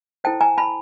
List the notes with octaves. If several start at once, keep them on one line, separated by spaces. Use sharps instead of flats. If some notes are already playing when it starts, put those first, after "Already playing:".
E4 A4 C5 G5 A5
G#5 A#5
A5 B5